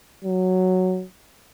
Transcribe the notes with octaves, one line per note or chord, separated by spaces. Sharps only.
F#3